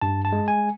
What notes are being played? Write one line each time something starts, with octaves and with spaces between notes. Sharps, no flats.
G2 A5
A5
G#3
G#5